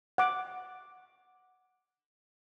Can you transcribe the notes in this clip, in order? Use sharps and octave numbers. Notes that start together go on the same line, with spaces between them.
F#5 D6